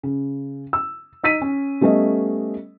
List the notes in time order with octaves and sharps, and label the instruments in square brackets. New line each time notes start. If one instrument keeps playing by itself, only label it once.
[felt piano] C#3
E6
D#4 E6 B6 D#7
C#4
G3 A3 B3 C#4 A4 D#5